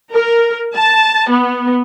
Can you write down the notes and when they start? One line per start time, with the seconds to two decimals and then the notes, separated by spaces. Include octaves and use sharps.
0.12 A#4
0.75 A5
1.28 B3